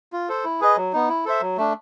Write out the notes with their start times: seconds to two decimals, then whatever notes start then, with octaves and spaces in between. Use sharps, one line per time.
0.13 F4
0.29 A4 C5
0.44 E4
0.61 G#4 B4 D#5
0.76 F#3
0.93 B3 D#4
1.09 E4
1.25 A4 C5 E5
1.41 F#3
1.57 A3 D4